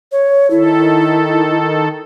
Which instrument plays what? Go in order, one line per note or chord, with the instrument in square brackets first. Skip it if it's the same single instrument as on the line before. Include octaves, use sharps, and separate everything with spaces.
[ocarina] C#5
[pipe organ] D#3 A4 [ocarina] E4